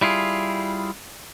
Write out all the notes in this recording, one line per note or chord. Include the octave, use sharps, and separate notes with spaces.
G3 E4 F4 G#4